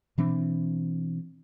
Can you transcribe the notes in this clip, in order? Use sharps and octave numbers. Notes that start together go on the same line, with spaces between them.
B2 E3 C4 D4